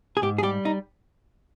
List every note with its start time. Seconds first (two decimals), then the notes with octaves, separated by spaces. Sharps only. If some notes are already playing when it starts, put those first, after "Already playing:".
0.17 G#4
0.22 G#2 G4
0.38 G#4
0.43 G3 G4
0.65 D#4